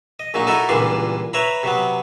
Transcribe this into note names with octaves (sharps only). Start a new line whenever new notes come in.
D#5
A#1 A#2 F#3 D#4
D#4 E4 F#4 A4 A#4 D#5
C#2 A#2 E3 G3 D4 C6
B4 C#5 E5 A#5 B5
C3 F#3 B3